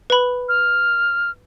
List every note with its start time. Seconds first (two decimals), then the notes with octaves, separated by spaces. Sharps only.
0.10 B4 B5
0.48 F6